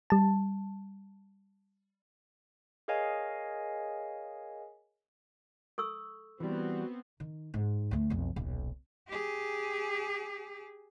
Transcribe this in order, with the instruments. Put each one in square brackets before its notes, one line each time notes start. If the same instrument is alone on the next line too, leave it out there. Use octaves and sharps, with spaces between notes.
[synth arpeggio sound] G3 A5
[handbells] G#4 A#4 C#5 D#5 F5 G#5
[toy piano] A4 C#6 E6
[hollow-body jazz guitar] E3 G3 [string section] B3 C4 [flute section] F#4
[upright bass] D#3
G#2
D2 A3
B1 F2
D#1 B1
[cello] G4 G#4